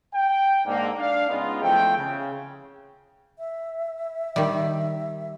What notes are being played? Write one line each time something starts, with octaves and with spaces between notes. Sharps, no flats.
G5
G#2 D3 A#3
D4 F5
C#3 G#3 B3 D#4 F4
E2 F3 A3 C4 G5
C#3
E5
D#3 G3